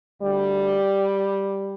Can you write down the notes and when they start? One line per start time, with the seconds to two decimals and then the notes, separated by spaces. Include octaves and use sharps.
0.22 D2 D3 G3